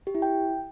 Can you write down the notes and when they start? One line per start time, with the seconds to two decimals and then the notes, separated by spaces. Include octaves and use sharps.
0.07 G4
0.15 E4
0.22 G5